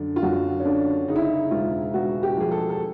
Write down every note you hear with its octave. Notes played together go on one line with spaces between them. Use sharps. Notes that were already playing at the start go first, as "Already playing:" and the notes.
Already playing: F#2 D3 D4
F4
F#2 F#4
C#4
D3 D4
C#3 D#4
E4
D#4
E1 F4
E1 F#4
G4
F3 G#4
A4
A4